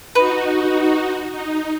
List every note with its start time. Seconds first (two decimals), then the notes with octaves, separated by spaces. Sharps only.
0.15 D#4 F#4 B4
1.32 D#4